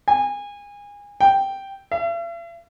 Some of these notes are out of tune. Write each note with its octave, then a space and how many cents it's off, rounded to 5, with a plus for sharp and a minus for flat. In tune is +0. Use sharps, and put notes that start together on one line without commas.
G#5 -30
G5 -5
E5 +45